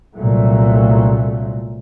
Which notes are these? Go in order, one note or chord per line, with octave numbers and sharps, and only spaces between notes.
C2 A#2 F#3 A3